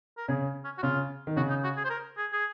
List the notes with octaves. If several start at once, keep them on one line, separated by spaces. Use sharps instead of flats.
A#4
C#3 G#4
C#4
F#4
C#3 F4
D#3
C#3 F#4
D#4
F#4
G#4
C5
A#4
G#4
G#4